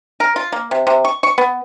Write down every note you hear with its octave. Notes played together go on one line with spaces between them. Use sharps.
A#4
F4
A#3
C3
C3
C#6
C#6
B3